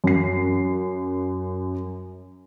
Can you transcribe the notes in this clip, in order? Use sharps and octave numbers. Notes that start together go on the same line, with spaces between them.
F#2 C7